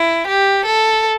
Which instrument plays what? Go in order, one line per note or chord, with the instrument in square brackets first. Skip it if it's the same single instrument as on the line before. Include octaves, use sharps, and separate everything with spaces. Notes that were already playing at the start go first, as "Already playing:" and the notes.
Already playing: [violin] E4
G4
A4